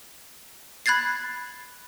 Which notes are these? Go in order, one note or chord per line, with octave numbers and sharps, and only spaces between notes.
B5 F#6 G#6 A6 C7